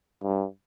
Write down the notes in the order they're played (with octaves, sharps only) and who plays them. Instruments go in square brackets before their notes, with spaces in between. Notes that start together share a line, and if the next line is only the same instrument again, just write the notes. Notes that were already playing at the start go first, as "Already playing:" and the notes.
[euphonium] G2